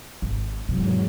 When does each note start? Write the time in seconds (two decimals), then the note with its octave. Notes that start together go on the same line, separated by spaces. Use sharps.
0.22 G#1
0.68 E2 G#2 C3 F#3